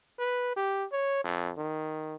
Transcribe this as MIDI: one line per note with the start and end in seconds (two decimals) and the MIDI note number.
0.19 0.53 71
0.56 0.84 67
0.92 1.23 73
1.24 1.52 41
1.57 2.15 51